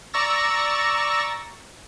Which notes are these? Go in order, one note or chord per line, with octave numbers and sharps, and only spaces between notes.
D5 A#5 C#6 E6 A6 A#6